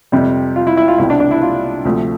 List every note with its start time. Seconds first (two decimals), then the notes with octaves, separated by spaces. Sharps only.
0.12 F2 C3 G3
0.56 F4
0.67 E4
0.77 E4
0.88 F4
0.98 C2 B2 G3 E4
1.10 D4
1.20 D4
1.31 E4
1.42 F4
1.85 D2 C3 F3 A3